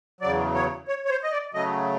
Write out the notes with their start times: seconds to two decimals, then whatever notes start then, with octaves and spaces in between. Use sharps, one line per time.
0.21 E2 C#3 F#3 D5
0.55 C#5
0.88 C#5
1.05 C#5
1.10 C5
1.23 D#5
1.32 D5
1.54 C#3 F#3 A3 D#5